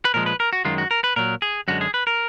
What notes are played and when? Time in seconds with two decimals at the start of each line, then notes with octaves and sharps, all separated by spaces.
0.05 B4
0.14 A#2 F3 G#3 A#4
0.26 B4
0.40 A#4
0.53 F#4
0.65 F#2 D#3 G#3 F4
0.78 F#4
0.91 A#4
1.04 B4
1.16 A#2 F#3 A#4
1.42 G#4
1.68 F#2 D3 G#3 F#4
1.81 G#4
1.94 B4
2.07 A#4